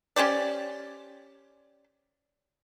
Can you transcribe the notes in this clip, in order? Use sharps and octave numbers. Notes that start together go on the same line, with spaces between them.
C#4 G4 C5 D5